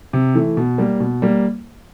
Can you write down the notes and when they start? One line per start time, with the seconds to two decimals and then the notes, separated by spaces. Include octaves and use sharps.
0.13 C3
0.35 E3 A3
0.57 B2
0.78 G3 A#3
1.00 B2
1.22 G3 A#3